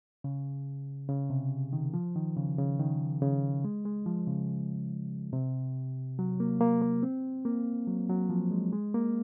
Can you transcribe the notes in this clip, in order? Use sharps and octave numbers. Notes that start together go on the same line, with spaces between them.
C#3
C#3
C3
D#3
F3
D#3
C#3
C#3
D#3
C#3
G#3
G#3
F3
C#3
C3
F#3
A#3
A#3
A#3
C4
A#3
F#3
F#3
F3
G#3
G#3
A#3